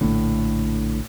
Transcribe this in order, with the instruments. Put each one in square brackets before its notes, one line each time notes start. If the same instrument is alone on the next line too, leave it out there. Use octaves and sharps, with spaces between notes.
[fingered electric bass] A#1 D3 [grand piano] A2